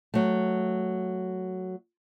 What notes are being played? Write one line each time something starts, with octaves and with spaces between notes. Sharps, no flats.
F#3 A3